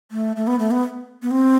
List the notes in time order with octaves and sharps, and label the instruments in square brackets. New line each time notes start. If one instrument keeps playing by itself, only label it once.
[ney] A3
A3
B3
A3
B3
B3
C4